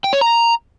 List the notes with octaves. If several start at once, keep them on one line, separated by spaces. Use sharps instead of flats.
G5
C#5
A#5